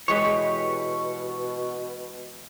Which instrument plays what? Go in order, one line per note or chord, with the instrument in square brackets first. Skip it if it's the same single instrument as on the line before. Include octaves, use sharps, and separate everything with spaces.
[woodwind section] B2 [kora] E3 G#3 D#5 [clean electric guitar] G4 B4 C#5 [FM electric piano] C#6